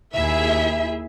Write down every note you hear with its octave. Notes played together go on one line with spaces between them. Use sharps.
D#2 E4 G#4 E5